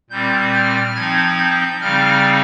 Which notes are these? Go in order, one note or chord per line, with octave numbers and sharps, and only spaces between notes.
A#2 G3 C4 G6
F6
F3 C4 D#4 G#6
G6
C#3 G3 C4 D#4 F6